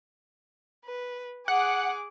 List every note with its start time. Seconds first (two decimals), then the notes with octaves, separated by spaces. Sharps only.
0.85 B4
1.48 G#4 F#5 D6